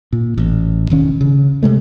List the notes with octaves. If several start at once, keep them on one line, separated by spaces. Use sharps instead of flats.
A#2
A1
E1 D#3 C#4
C#3
C3 G#3 A3